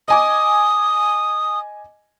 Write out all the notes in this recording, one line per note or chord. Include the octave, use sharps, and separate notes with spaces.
D#5 G#5 D6 D#6